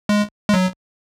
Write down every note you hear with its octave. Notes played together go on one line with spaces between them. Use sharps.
G#3
G#3
F#3